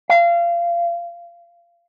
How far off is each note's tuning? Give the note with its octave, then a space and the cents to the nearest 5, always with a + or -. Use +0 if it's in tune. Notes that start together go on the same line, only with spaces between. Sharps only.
F5 -25